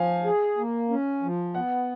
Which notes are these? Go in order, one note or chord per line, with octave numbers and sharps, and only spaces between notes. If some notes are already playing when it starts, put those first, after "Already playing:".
Already playing: F3 F5 G#5
G#4
A#3
C#4
F3
B3 F#5